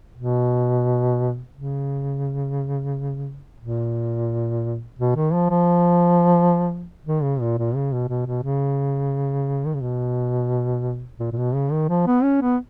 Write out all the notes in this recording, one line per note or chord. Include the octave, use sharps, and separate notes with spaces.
B2
C#3
A#2
B2
D#3
F3
F3
D#3
C#3
A#2
A#2
C#3
B2
B2
B2
C#3
D#3
C#3
B2
A#2
A#2
B2
C#3
D#3
F3
B3
C#4
B3